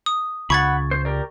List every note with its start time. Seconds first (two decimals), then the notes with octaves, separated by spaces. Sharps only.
0.06 D#6
0.50 C#2 F#5 B5 C#6 G#6 A6
0.91 C5
1.05 G4 A#4 D5